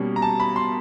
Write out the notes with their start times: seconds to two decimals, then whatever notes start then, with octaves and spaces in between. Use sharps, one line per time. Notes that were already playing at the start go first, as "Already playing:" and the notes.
Already playing: B2 G3 A#3 C#4
0.16 A#5
0.22 A5
0.40 B5
0.56 C6